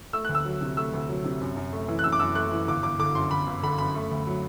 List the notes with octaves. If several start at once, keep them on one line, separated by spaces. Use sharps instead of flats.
A3 E6
F#6
D2
E6
F#3
C3
A3 E6
D2
F#3
C3
F#2
F#2
A3
E3
F#6
F#2 E6
D6
F#2 E6
A3 F#6
E3
G1 D6
G1 D6
D3 D6
F#2 C6
G1 B5
G1
D3 B5
F#2 B5
A3
D2
F#3